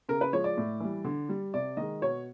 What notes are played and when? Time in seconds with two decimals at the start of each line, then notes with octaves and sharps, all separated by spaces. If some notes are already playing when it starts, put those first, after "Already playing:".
0.09 C#3 A#4
0.21 B4
0.33 F3 G#3 C#5
0.44 D5
0.57 A2
0.80 E3 G3
1.04 D3
1.29 G3
1.54 C3 D5
1.77 D#3 G#3 D#5
2.01 B2 C#5